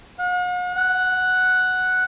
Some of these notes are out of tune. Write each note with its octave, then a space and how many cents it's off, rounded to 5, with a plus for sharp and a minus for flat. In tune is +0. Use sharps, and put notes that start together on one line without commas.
F#5 -45
F#5 +0